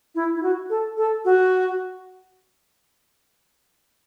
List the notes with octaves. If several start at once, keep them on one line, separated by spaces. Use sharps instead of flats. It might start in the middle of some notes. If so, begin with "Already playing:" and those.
E4
E4
F#4
A4
A4
F#4